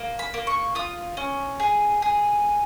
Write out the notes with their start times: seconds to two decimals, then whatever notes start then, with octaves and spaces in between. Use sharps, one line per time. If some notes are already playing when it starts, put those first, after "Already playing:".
Already playing: A#3
0.19 B5
0.34 A#3
0.47 C#6
0.75 F4 D#6
1.17 C#4
1.60 G#4
2.02 G#4